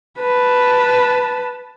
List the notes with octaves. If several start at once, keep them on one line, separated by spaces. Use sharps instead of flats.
B4 A5